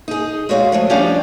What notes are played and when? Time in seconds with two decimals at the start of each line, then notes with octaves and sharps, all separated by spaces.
0.08 D#4 G#4
0.49 G#3 F#4 C#5 E5 F5
0.72 F3 G#3 A3
0.90 F3 G3 C#4 D4 G4 F5